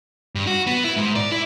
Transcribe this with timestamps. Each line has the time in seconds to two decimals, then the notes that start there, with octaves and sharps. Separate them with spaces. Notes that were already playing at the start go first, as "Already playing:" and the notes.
0.35 G2
0.47 F#4
0.67 B3
0.84 E4
0.97 G#2
1.16 D5
1.32 E4